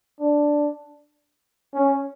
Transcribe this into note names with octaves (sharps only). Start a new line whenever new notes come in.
D4
C#4